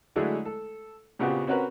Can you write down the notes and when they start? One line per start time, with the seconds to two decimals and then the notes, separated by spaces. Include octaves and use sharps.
0.16 D3 F#3 G#3 A3 E4 G#4
0.45 A4
1.19 A#2 C#3 B3 C4 F#4 G4
1.47 C4 C#4 F#4 A#4 B4